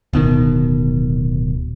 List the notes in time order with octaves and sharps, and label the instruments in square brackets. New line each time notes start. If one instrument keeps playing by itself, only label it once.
[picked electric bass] D1 B2 D#3